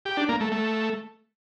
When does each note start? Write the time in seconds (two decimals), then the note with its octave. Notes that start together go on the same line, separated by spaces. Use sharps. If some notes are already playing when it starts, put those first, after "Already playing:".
0.05 G4
0.17 D4
0.29 A#3
0.40 A3
0.52 A3